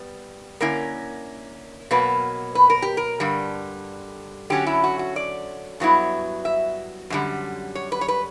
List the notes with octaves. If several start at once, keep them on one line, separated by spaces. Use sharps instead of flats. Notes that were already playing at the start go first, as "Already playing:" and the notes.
Already playing: G3 B3
D3 A#3 C#4 E4 A#4
B2 F#3 A#3 B4
B4
A#4
G4
A#4
G2 D3 G3
D3 F#3 C#4 G4
E4
F#4
F#4
D5
G2 F#3 B3 E4
E5
F#2 D3 G3
C#5
B4
C#5
B4